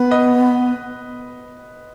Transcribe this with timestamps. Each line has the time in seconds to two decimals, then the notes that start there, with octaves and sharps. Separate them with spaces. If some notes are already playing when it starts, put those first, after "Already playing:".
Already playing: B3 B4
0.11 B4 D#5